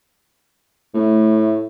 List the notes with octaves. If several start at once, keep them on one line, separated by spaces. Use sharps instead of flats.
A2 A3